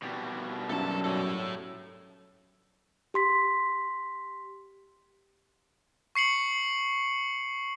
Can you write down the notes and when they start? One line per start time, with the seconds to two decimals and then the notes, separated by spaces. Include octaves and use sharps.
0.02 B2 G3
0.70 F#2 F#3 A4 E5 A5
1.04 A4 C#5
3.14 G4 C6 B6
6.15 C#6 C7 C#7 F#7